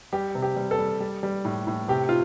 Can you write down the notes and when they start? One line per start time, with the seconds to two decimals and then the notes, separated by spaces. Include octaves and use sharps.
0.13 G3 G4
0.35 C3
0.42 G4
0.56 G3
0.71 A4
0.79 G3
1.00 G3
1.23 G3
1.45 A2
1.67 A2
1.88 C3 G4
2.09 F4